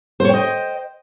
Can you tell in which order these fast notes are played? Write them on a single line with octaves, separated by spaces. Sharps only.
C5 C#5 G5 D#5